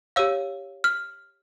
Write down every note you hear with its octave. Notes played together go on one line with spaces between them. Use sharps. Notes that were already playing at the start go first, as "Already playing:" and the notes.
G4 C#5 F5 E6
F6